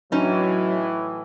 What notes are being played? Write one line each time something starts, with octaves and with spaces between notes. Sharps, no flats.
A2 E3 F#3 C#4 D#4